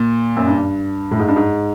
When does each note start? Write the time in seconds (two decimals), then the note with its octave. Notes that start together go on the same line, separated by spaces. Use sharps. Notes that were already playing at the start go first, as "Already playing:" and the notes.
Already playing: A#2
0.36 F#2
0.47 G2
1.11 A2
1.19 G#2
1.28 G2
1.36 G#2